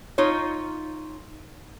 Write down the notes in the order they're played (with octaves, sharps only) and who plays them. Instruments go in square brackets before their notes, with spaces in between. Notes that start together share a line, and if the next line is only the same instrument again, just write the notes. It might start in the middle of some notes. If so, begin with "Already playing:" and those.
[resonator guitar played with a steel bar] D#4 F4 C#5